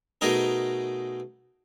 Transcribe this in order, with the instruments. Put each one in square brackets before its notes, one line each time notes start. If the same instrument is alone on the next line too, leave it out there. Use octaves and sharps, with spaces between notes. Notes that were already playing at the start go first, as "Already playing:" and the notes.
[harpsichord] B2 A3 D#4 G#4 A#4